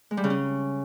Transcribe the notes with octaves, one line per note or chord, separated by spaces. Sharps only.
G#3
G3
C#3
C#4